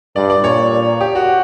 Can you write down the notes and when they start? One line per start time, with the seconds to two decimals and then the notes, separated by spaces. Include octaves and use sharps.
0.16 G2 D5
0.30 D5
0.43 A#2 C#5
1.00 G4
1.15 F#4